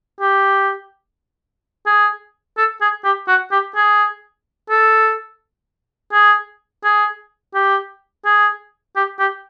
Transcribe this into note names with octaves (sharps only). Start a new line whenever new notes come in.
G4
G#4
A4
G#4
G4
F#4
G4
G#4
A4
G#4
G#4
G4
G#4
G4
G4